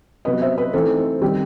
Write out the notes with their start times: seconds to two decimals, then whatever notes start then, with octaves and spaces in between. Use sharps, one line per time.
0.25 C3 F#3 B3 B4 D#5
0.42 C5 E5
0.58 B4 D#5
0.73 E3 A3 C4 D#4 A4 C5
0.98 A4
1.21 D#3 G3 C4 G4